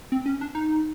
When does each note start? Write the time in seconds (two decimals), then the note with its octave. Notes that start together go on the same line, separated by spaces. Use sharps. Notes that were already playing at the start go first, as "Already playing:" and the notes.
0.12 C4
0.26 C#4
0.41 D4
0.55 D#4